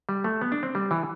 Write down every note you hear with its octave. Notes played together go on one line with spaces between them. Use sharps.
G3
A3
B3
D4
C4
G3
E3